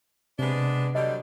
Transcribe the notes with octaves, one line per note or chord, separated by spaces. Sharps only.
C3 G#3 B3 D4
D3 F#3 G3 D#5